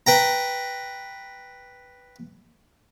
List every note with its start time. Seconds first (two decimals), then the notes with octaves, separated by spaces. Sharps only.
0.07 B4 G5 A#5